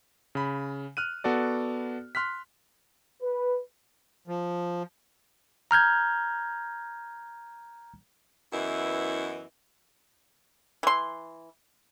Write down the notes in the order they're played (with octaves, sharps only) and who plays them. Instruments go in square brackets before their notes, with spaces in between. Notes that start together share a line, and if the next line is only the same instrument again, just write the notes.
[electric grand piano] C#3 B5
F6 F#6 D#7
B3 F#4 A4 D5
C6 F6 F#6 B6
[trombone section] B4
[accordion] F3
[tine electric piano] A#5 F6 G6 G#6
[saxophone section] F#2 E3 B3 E4 D#5
[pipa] E3 C6